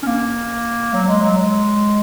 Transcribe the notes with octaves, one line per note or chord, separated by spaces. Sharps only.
C#4
A#3
F#3
G#3
F#3
G#3